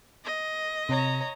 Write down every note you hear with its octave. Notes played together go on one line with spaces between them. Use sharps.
D#5
C3 C#5 A#5